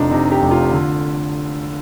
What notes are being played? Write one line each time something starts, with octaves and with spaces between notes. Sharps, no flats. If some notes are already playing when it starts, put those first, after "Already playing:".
Already playing: F1 C3 D4 D#4 F4
C3 D#4
G4
F1
F4
D3